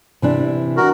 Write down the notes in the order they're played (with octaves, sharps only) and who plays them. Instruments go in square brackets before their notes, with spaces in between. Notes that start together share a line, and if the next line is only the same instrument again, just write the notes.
[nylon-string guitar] C3 E3 D4
[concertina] F#4 A#4